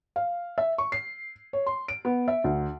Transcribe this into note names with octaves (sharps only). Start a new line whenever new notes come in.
F5
E5
C#6
C7
C#5
C6
D7
B3
E5
D2